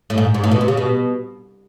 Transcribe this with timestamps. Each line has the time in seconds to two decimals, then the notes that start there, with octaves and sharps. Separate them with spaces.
0.10 A2
0.18 G#2
0.34 G#2
0.44 A2
0.51 B2
0.61 C3
0.68 C#3
0.77 B2